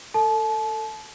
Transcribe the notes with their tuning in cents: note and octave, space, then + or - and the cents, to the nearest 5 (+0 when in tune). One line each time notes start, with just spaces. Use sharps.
A4 +25 A5 -35